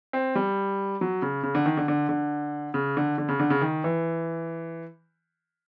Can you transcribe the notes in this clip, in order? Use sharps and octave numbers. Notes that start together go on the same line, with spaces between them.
C4
G3
F#3
C#3
C#3
D3
D#3
D3
D3
D3
C#3
D3
D3
C#3
D3
C#3
D#3
E3